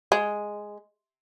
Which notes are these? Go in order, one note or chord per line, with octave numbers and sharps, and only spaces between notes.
G#3